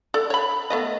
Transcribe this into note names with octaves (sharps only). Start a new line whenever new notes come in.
A4 D5
C#5 B5
A3 B3 D#5